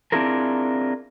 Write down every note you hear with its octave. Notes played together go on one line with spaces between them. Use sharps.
C4 D4 E4 F4 G#4 A#4